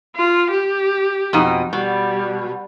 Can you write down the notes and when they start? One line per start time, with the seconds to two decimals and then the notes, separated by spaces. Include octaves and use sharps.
0.16 F4
0.51 G4
1.33 F2 B2 D#4
1.73 B2 G3